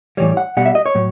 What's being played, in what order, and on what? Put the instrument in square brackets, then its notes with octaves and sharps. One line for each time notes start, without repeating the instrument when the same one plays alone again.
[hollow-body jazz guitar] A2 E3 G3 C#5
F#5
B2 G3 F#5
E5
D#5
C#5
A2 F#3